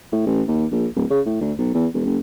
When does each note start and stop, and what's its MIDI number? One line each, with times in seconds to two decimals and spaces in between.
0.12 0.24 45
0.26 0.42 33
0.48 0.66 39
0.72 0.87 34
0.96 1.05 26
1.11 1.20 49
1.26 1.41 45
1.41 1.53 38
1.58 1.73 35
1.74 1.87 40
1.94 2.03 28
2.06 2.18 30